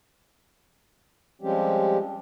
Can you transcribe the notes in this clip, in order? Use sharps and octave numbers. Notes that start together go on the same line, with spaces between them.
F3 G3 G#3 C4 C#4 G4